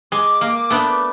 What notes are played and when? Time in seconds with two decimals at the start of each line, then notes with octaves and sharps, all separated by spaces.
0.12 G#3 D6
0.41 A#3
0.70 A3 B3 D4